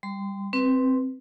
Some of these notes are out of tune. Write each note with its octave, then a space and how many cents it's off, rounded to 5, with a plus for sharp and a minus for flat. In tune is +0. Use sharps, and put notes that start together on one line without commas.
G3 +10 C6 -30
C4 +0 B4 +0